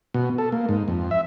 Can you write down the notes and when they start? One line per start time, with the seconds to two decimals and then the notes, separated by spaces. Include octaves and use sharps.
0.14 B2
0.38 A4
0.52 A#3
0.69 G#2
0.88 F2
1.11 E5